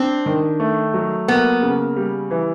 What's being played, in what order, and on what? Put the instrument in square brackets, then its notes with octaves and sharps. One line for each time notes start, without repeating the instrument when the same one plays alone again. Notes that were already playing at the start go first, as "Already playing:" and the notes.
Already playing: [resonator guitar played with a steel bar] C4 [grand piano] D4
[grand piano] D#3
A3
F#3
[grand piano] A#3 [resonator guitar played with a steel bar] B3
[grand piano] C#3
G3
E3